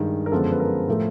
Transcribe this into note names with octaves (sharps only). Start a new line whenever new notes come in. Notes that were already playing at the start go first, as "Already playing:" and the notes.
Already playing: G2 D#3 G#3
A#4
F#2 D3 F3 G#3 B3 A4
B4
A#4
A2 F3 A3